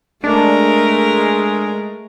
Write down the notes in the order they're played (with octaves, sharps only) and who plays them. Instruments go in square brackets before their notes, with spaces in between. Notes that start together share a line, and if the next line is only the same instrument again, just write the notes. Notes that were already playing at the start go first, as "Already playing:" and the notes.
[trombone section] G#3 [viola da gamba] A3 A#4 [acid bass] D4